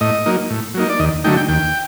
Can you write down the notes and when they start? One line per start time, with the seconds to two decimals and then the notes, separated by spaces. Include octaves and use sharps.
0.01 A2 D#5
0.26 F#3 A#3 D#4
0.50 A2
0.74 F#3 A#3 D#4
0.89 D5
1.00 D#2 D#5
1.24 D3 F#3 A3 D#4 G5
1.37 G5
1.49 D#2 G5